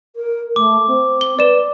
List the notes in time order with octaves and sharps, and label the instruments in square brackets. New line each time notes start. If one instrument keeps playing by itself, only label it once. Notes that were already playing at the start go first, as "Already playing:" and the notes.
[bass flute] A#4
[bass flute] A3 [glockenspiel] D6
[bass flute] C4
[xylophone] G7
[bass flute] B4 [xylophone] D5 E7